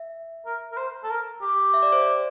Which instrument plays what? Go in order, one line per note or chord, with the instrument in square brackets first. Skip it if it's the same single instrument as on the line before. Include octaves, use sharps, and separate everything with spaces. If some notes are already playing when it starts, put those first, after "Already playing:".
Already playing: [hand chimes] E5
[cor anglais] A#4
A#4
C5
A4
A#4
G4
[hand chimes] E5
D5
C5
D5